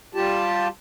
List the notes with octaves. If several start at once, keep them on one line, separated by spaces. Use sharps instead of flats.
G3 F4 G4 A5